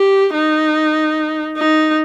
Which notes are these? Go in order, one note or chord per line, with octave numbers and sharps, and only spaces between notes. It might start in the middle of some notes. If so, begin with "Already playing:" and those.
Already playing: G4
D#4
D#4